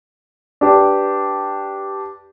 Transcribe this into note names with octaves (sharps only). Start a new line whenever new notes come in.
D4 G4 B4